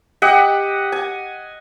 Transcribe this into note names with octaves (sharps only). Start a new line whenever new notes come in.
G4 D#5 F#5
G#5